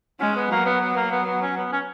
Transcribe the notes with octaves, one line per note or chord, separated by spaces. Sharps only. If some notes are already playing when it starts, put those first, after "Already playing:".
G#3 C#4
B3
F#3 A#3
B3
B3
A#3
B3
B3
C#4
B3
C#4